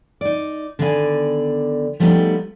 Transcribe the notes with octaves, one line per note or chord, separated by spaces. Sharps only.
D#4 D5
D3 D#3 B3 D5 F5 G#5
F3 G3 A3 B3 D4 D#4